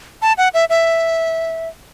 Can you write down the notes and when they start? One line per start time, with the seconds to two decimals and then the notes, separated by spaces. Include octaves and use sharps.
0.22 A5
0.38 F#5
0.54 E5
0.69 E5